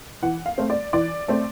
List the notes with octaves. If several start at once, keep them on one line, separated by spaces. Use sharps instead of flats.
E3 F#5
F5
A3 C4
D5
E3 D5
A3 C4